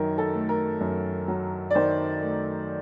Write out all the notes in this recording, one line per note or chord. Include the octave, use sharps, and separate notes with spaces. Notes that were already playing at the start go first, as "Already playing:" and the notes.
Already playing: F#2 D#3 F#3 A#4
A4
A3
A#4
F#2
F#3
D5
D#3 C5
A3